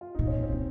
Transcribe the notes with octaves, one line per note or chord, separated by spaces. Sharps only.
F4
A#2 D#4
C#4
C4
A#2